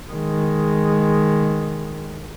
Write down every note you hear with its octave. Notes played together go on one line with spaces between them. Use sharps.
D#3 G#3